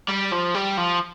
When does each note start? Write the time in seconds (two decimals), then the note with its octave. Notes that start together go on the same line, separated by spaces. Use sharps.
0.09 G3
0.32 F3
0.54 G3
0.77 F3